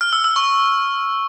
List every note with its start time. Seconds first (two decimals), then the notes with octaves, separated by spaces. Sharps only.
0.01 F6
0.13 E6
0.24 E6
0.36 C#6